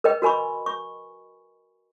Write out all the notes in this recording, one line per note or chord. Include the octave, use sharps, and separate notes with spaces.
A#4 B4 D#5 G5
F#4 A#4 G#5 B5 C#6
C#6